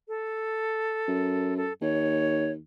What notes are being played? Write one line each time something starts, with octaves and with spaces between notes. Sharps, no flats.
A4
F#2
A4
D#2 C#5